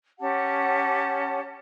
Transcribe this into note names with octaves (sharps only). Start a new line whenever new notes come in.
C#4 G4 F#5 A5